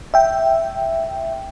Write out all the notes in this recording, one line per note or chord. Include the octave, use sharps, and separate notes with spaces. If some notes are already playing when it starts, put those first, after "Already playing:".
E5 G5